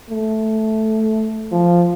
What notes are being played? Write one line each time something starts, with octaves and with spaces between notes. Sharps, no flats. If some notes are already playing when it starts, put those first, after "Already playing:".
A3
F3